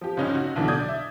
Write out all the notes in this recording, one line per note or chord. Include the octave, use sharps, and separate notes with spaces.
F3 G4
C#2 G2 C#4 D#4 C#5 F6
F#4
B1 D3 E3 F#3
D5 D#6 G6 G#6
E5